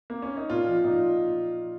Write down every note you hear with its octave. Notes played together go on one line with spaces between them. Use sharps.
A#3
C#4
D#4
A#2 F4
F3
A#2 D#4